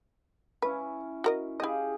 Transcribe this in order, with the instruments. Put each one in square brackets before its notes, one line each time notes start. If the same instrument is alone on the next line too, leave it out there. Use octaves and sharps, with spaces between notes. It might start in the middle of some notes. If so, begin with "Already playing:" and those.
[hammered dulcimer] C#4 E4 [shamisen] B4
[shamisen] F#4 A#4 D#5
[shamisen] E4 D#5 [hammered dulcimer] G4 G#4 F5